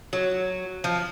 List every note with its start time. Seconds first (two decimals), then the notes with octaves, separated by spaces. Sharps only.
0.13 F#3
0.84 F3